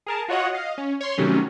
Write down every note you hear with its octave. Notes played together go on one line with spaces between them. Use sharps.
G#4 A#4 A5
F4 F#4 C#5 D#5 F#5
D#5 F5
C#4
C#5 C6
C3 D#3 F#3 G3 A3 C#4